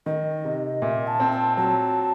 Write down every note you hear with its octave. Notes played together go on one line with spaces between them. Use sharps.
D#3 D#5
C3
A#2 E5
A5
C4
A5
F#3 A5